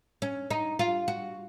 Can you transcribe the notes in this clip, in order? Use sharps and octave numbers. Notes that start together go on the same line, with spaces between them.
C#4
D#4
F4
F#4